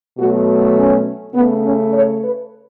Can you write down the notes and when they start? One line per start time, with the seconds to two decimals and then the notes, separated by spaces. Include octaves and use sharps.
0.18 B2 F#3 A3 F#4
0.77 C#4
1.34 C#3 A3 B3
1.63 C#4
1.93 C#5
2.22 B4